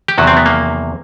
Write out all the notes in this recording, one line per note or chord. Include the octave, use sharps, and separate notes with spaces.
G4
E2 C3 D#3 F#3 F#4
C4
B3
A#3